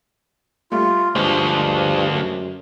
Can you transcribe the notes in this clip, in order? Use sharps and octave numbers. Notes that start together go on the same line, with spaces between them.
G3 A3 F4
D2 G2 F3 G#3 C5 F#7
F#2